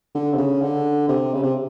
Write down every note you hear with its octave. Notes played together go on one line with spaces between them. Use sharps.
D3
C3
C#3
D3
C3
C#3
C3